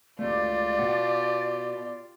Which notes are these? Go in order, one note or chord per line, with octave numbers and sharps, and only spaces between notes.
C#2 A3 F4 G4 D5
B2 F#5